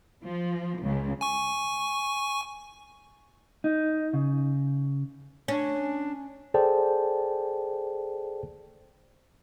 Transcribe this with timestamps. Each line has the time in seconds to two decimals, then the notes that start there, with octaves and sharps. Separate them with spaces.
0.23 F3
0.81 C#2 C#3
1.21 G#5 C#6
3.64 D#4
4.13 C#3
5.48 C#4 D4
6.54 G#4 A4 C5 D5 G5 A5